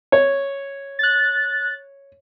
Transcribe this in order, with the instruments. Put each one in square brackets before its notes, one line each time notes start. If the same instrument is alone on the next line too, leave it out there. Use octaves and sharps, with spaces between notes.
[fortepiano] C#5
[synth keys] F#6 A6